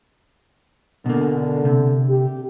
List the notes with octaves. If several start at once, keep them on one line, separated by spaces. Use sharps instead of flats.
B2 D3 A#3
C3
G4